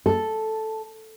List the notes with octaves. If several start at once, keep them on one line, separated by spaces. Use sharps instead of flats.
A4